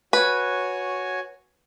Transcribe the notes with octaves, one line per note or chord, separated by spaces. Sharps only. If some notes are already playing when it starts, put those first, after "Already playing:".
F#4 B4 C#5 G#5